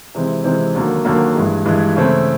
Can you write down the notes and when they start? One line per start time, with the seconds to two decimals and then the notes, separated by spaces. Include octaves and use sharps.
0.15 C3 E3 G#3 C4
0.44 C3 E3 G#3 C4
0.75 D#2 D3 F#3 A#3
1.05 D#2 D3 F#3 A#3
1.35 G2 E3 G#3
1.65 G2 E3 G#3
1.96 C#3 E3 A3 C4 E4